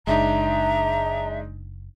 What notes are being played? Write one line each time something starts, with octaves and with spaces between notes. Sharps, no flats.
F#1 G#3 D4 D#4 E5 A#5